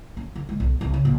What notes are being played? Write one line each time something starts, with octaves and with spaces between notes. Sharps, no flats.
C#4
D3
G#3
B1
C2
C#3
A#1